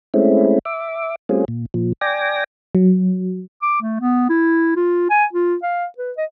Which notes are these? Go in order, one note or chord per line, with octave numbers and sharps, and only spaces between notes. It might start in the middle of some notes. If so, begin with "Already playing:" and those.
G#3 A3 C4 C#4 E4
E5 D6
G3 A3 C4 C#4 F4 G#4
A#2
A#2 F3
D5 G5 G#5 D6 A#6
F#3
D6
A3
B3
E4
F4
G#5
F4
F5
B4
D#5